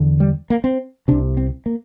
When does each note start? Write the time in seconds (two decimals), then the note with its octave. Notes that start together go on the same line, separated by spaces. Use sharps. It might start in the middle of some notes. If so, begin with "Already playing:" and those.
Already playing: E2 D3
0.20 G3
0.50 A#3
0.64 C4
1.08 C2 C3 D4
1.37 C4
1.66 A#3